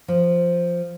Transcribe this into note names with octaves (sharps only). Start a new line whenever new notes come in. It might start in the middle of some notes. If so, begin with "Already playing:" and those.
F3